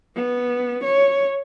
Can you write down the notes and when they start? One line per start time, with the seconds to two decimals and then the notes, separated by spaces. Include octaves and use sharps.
0.15 B3
0.84 C#5